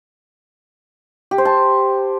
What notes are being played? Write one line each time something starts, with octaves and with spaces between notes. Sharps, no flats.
G4
C5
A5